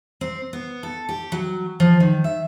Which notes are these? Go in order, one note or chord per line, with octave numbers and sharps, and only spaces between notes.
C4
B3
A4
G4
F#3
F3
D#3
E5